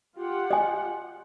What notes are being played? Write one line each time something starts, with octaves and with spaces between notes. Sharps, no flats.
F4 G4 F#5
D#5 G#5